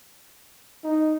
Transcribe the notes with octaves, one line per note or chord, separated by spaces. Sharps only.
D#4